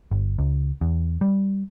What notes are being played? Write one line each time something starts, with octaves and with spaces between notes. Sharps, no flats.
G1
C#2
E2
G3